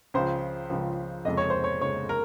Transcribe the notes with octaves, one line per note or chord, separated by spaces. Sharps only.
C#2 C#3 F3 C5
C#2 C#3 F3
F1 F2 C#3 G#3 D#5
C#5
C5
C#5
F1 F2 C#3 G#3 C#5
A#4